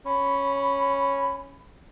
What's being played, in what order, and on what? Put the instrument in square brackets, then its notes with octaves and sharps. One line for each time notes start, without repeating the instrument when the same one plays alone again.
[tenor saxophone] C#4 [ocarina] B5